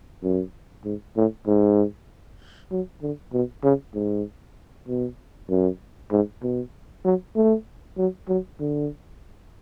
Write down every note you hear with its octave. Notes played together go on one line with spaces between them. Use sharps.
F#2
G#2
A2
G#2
F#3
D3
B2
C#3
G#2
B2
F#2
G#2
B2
F#3
A3
F#3
F#3
D3